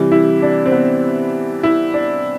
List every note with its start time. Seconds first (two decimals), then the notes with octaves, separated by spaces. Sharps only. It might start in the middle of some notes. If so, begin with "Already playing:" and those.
Already playing: C3 E3 G3
0.12 E4
0.42 D4
0.66 C4
0.72 B3
1.63 E4
1.94 D4